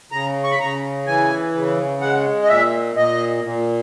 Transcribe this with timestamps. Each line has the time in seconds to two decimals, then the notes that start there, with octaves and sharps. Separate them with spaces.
0.12 C#3 A#5
0.44 C#6
0.51 B5
0.59 C#3 A#5
1.06 E3 G#5
1.54 C#3
2.01 G#3 F#5
2.43 D#5
2.49 A#2 E5
2.96 A#2 D#5
3.44 A#2